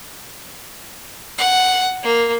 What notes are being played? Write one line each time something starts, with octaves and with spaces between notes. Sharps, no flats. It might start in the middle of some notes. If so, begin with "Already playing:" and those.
F#5
A#3